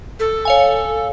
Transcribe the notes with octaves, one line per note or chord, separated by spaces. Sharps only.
A4
C#5 F5 G#5